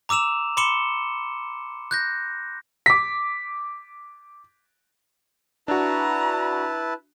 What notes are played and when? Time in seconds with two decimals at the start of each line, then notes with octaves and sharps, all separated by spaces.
0.09 A#5 D6 E6 E7 F7
0.57 B5 C6 D6 C#7 E7 G7
1.91 F#6 G6 A#6
2.86 D6 B6
5.68 D4 E4 F#4 B4 A5 A#5